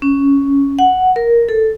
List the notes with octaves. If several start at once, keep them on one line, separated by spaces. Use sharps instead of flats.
C#4
F#5
A#4
A4